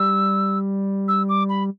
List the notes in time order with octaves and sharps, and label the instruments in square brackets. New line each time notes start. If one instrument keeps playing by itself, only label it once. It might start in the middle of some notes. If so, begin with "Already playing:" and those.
Already playing: [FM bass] G3 [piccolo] E6
[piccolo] E6
D6
B5